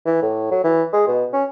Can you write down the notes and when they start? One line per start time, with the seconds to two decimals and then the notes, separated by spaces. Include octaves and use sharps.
0.06 E3
0.22 A2
0.51 F#3
0.64 E3
0.93 G#3
1.07 B2
1.33 C#4